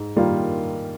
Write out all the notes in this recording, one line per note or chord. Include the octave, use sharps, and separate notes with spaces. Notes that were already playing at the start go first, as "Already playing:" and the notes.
Already playing: G#2
D#3 G3 A#3 F4